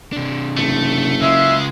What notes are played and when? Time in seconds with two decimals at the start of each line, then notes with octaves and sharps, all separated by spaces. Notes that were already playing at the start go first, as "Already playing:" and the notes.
0.13 C3 D4
0.57 F#1 A3
1.22 C#3 G#3 F4 E5